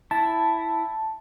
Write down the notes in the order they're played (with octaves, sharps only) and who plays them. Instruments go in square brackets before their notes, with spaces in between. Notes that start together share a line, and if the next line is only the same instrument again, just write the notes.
[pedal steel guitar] E4 [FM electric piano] A5